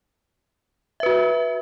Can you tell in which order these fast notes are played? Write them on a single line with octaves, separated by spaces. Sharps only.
E5 B4 F#4